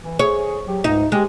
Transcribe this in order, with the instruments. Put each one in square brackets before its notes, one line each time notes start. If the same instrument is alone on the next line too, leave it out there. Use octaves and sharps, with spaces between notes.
[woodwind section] E3
[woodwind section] G#4 [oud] C#5
[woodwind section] F#3 G4
[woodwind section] C#2 G#2 [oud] D#4
[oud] G#3 [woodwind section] G4